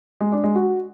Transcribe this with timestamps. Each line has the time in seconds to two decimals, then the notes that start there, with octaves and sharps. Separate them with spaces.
0.21 G#3
0.32 D4
0.44 G#3
0.55 F#4